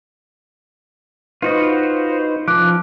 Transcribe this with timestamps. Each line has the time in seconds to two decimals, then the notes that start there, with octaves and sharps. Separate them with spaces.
1.42 D#4 F4 F#4 B4 C5 D#5
2.48 E2 F3 C#4 F5 D6 F#6 D7